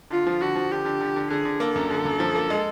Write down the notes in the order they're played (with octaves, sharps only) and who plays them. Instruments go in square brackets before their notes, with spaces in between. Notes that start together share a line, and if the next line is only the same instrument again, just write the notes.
[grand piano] D3 [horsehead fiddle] F4
[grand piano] F3
[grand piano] D3 [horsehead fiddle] F#4
[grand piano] F3
[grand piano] D3 [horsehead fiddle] G4
[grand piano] D3
D3
D3
[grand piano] D3 [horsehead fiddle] G#4
[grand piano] D3
[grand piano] A#3 [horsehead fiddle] A4
[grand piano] F#2
D3
F#2
F3
A#3
G#3